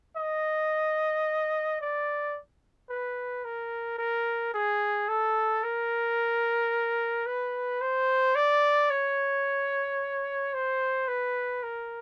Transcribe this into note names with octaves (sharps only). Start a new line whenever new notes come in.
D#5
D5
B4
A#4
A#4
G#4
A4
A#4
B4
C5
D5
C#5
C5
B4
A#4